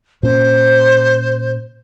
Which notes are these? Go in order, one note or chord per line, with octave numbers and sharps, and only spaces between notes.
A#2 C#4 C5